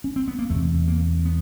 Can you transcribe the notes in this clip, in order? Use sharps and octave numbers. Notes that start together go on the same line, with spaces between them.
C#4
C4
B3
A#3
E2 C3 A3
A#3
B3